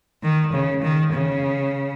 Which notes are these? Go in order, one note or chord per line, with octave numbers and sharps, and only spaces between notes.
D#3
C#3
D#3
C#3